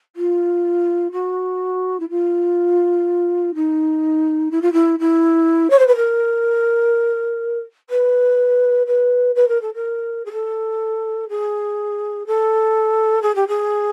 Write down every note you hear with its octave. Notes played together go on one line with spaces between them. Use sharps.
F4
F#4
E4
F4
D#4
E4
F4
E4
E4
C#5
C5
B4
A#4
B4
B4
B4
A#4
A4
A#4
G#4
A4
G#4
A4
G#4
G4
G#4